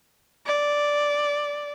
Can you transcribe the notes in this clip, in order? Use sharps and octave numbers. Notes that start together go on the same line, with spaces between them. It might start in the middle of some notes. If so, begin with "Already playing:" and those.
D5